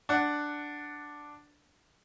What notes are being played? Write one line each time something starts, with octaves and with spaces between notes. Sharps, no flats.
D4 F#5